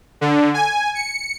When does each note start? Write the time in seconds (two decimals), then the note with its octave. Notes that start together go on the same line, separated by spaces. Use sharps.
0.21 D3
0.54 G#5
0.95 C#7